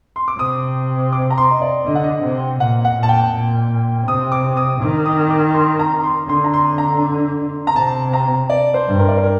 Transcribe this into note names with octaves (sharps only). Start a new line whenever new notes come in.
C6
D6
C3 D#6
D6
A#5
C6
D#5
D5
D3 D#5
F#5
D#5
C3
A#2 F#5
F#5
A#2
A5
G5
A#2
C3 D#6
D6
D#6
D#3 D6
D#6
D6
C6
A#5
C6
D3 C6
A#5
C6
A#5
A#5
C3 A5
A#5
D5
C5
G2
A#4
D5
C5
A#4